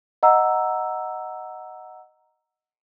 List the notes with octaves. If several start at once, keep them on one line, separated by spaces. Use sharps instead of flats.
D#5 F#5 A#5 E6